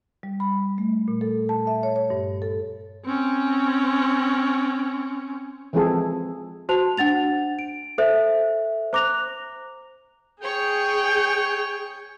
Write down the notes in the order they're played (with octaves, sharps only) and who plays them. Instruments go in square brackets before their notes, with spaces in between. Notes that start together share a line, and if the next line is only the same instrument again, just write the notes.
[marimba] G3
B5
A3
A#2
A4
A5
E5
C#5
C#5
G2
A4
[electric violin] C4 C#4
[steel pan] E3 F3 G#3 C4 G#4 A4
[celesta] F#4 C5 A5 F7
D4 F#5 A6 F7
D7
A4 C5 E5
C5 A#5 D6 F#6 A#6 F7
[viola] G#4 G5 [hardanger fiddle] C#5 C#6